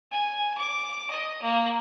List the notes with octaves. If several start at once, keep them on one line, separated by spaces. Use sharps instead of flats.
G#5
D6
D#5
A#3